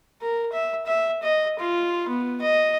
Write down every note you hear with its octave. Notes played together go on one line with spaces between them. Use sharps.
A#4
E5
E5
D#5
F4
B3
D#5